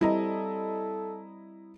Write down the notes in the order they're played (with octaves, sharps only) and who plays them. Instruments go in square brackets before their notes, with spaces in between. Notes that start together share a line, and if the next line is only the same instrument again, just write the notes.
[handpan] G3 C4 [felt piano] E4 D#5 A#5 [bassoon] A4